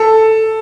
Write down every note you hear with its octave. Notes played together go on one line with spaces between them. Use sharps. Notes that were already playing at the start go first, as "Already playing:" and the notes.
Already playing: A4